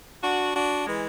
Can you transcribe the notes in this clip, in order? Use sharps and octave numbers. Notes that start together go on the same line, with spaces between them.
D4 F#4
D4 F#4
E3 G#3